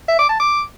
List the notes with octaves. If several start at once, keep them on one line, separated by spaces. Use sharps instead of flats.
E5
D6
A5
D6